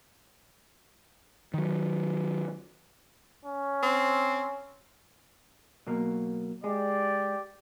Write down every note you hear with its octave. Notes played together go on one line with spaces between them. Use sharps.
D#3 F#3
C#4
C4
B2 F#3 A#3
G#3 G4 D5